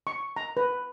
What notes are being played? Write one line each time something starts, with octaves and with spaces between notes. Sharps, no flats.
C#6
A#5
B4